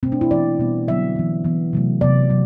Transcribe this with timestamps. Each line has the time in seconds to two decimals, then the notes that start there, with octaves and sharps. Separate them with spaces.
0.03 B2 C4
0.06 A3
0.12 D4
0.21 E4
0.31 E3 B3 D5
0.59 B2 G3 B3
0.88 D3 F#3 B3 E5
1.16 E3 B3
1.44 E3 B3
1.73 C3 F#3 A3
2.01 C3 F#3 B3 D5
2.30 C3 F#3